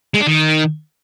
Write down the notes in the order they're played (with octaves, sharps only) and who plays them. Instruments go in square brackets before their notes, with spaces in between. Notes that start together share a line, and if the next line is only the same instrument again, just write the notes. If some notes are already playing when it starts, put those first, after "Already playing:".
[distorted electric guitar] G#3
D4
D#3